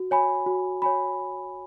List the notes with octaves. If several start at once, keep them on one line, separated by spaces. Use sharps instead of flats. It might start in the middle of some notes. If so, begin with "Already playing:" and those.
Already playing: F#4
C#5 G#5 B5
F#4
C#5 G#5 B5